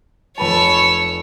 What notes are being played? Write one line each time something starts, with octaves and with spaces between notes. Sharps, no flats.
F1 B4 C#5 A5 E6